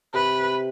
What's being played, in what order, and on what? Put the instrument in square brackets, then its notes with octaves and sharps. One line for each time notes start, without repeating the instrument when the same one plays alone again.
[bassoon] C3 [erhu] B4